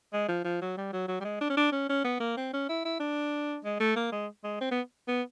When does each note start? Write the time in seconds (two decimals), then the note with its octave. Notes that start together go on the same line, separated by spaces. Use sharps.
0.14 G#3
0.29 F3
0.45 F3
0.62 F#3
0.78 G3
0.93 F#3
1.08 F#3
1.21 G3
1.25 G#3
1.41 D4
1.50 C#4
1.57 D4
1.72 C#4
1.89 C#4
2.05 B3
2.20 A#3
2.37 C4
2.53 C#4
2.69 E4
2.85 E4
3.00 D4
3.65 G#3
3.80 A3
3.96 A#3
4.12 G#3
4.44 G#3
4.61 C4
4.71 B3
5.08 B3